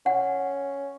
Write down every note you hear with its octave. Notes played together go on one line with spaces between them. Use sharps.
C#4 F#5